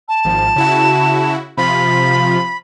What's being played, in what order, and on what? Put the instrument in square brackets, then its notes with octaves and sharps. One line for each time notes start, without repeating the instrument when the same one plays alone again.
[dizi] A5
[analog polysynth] G#1 F3
C#3 E4 F#4
[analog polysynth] C3 F3 F4 [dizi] B5